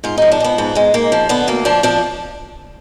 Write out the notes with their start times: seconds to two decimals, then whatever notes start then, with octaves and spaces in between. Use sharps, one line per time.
0.04 G#2 F4
0.18 F3 D#4
0.32 D4
0.40 F3 B3
0.58 G#2 B3
0.75 G#2 G#3
0.94 G#2 A#3
1.12 F3
1.29 D3 B3
1.47 D2 A#3
1.65 F3 D4
1.83 F3 D4